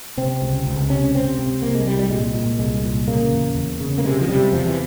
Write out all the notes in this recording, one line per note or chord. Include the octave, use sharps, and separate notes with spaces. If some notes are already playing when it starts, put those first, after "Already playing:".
C3 C4
C#2
C#2
C3 C#4
C3 C4
C3
C2 A#3
G#3
C2 G3
G3
A#2 G#3
A#2
C2 G#3
A#2
C#3 A#3
E2
E2
C#3
A#3
C3 G#3
F3
C3 G3
E2 F3
E3